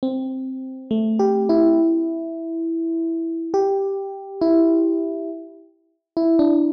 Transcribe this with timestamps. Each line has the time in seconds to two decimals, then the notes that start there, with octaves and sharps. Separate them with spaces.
0.03 C4
0.91 A3
1.19 G4
1.49 E4
3.54 G4
4.41 E4
6.17 E4
6.39 D4